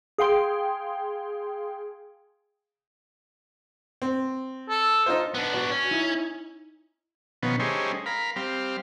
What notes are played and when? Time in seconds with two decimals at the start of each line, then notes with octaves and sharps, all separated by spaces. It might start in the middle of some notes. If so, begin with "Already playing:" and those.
0.18 G#4 F5 G5 C6
4.02 C4
4.69 A4
5.06 D#4 F4 C5
5.34 B3 D4
5.53 F#4 D5
5.71 C#4
5.91 D#4 E4
7.43 B2 D#3 F3 B3 C#4
7.60 G3 A3 C#4 D#4 G#4 C5
8.06 A#4 F5 B5
8.36 G3 C4 F5